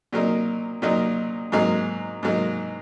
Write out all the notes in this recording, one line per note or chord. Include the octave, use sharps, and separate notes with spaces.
A#2 F#3 A#3 D#4
A#2 F#3 A#3 D#4
G#2 F#3 A#3 D#4
G#2 F#3 A#3 D#4